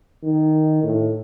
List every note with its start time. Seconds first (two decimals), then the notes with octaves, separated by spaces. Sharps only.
0.23 D#3
0.84 A2